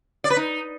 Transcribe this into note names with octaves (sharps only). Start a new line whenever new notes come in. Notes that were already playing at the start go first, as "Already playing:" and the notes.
D5
B4
D#4